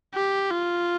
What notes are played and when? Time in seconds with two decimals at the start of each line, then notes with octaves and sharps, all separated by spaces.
0.15 G4
0.51 F4